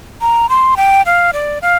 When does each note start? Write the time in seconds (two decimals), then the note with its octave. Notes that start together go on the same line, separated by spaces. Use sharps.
0.21 A#5
0.50 C6
0.77 G5
1.06 F5
1.33 D5
1.62 F5